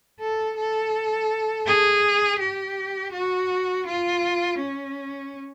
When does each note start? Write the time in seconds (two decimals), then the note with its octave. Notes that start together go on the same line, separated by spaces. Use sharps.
0.21 A4
0.57 A4
1.67 G#4
2.40 G4
3.13 F#4
3.87 F4
4.60 C#4